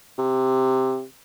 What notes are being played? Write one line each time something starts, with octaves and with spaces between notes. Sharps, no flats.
C3